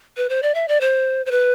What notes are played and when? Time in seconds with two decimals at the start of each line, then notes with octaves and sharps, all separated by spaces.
0.17 B4
0.29 C5
0.43 D5
0.55 E5
0.68 D5
0.81 C5
1.26 C5
1.31 B4